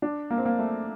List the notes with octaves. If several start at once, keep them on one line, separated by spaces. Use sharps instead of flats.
D4
A#3
C4
A#3
A3